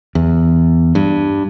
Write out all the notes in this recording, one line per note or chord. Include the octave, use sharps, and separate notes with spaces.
E2
G2